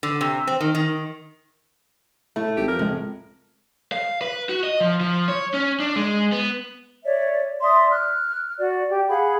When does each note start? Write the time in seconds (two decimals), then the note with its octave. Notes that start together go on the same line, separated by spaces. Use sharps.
0.03 D3
0.21 C3
0.47 C4
0.61 D#3
0.75 D#3
2.36 A2 A3
2.57 G#1 G4
2.68 F2 A#4
2.79 C#2 A2 G#3
3.92 F5
4.21 B4
4.49 F#4
4.64 D#5
4.81 F3
5.00 F3
5.28 C#5
5.54 C#4
5.80 D4
5.96 G#3
6.32 B3
7.04 C#5 D5 E5
7.61 D5 E5 C6 D#6
7.91 F6 F#6
8.57 F#4 D5
8.89 G4
9.08 G#4 F5 F#5 B5